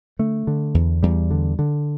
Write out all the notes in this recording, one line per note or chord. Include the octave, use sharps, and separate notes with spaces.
D3 A3
D3
E2
E2 G3
D3
D3